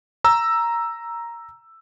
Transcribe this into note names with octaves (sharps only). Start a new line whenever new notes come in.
A#5 E6